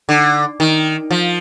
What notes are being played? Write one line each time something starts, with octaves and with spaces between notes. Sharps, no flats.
D3
D#3
F3